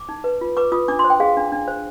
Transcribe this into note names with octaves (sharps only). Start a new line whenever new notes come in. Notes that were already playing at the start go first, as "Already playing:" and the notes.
Already playing: D6
D#4
B4
F4
B4 D6
F4 D#6
D4 D6
C6
C5
G5
G#4 F5
D4
D4
C5